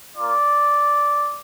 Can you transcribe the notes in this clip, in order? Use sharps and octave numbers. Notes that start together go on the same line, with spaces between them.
A#3 F4 D5